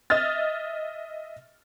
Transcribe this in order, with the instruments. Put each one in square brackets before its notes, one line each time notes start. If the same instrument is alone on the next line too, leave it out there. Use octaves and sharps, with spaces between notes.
[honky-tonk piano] D#5 E5 F6 A6